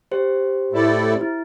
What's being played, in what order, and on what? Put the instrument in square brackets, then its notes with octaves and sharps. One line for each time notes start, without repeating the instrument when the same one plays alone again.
[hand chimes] G4 C5
[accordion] A2 A3 E4 A4 D5
[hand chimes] E4